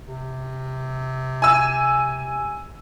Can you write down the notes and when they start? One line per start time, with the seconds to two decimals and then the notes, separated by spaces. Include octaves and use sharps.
0.07 C3
1.42 G#5 E6